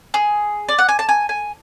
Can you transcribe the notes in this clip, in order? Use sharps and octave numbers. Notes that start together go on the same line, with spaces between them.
G#4
D5
F#5
G#5
A5
G#5
G#5